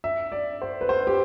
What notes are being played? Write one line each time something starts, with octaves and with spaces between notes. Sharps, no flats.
E5
D5
C5
B4
C5
G4